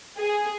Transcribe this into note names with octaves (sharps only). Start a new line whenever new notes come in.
G#4